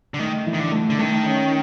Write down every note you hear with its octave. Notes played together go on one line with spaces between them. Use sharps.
D3
D#3 A3
E3
D#3
D3
A3
D3
D#3 A3
C#4